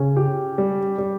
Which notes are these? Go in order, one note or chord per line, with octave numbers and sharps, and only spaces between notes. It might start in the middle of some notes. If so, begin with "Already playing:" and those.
Already playing: C#3 C#4
G4
G3
G3